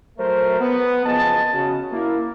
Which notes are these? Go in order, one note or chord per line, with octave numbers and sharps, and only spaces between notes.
F#3 A3 A#4 C5
B3
F#1 F3 G#4 D#5 A5
C#3 F#4
A#3 E4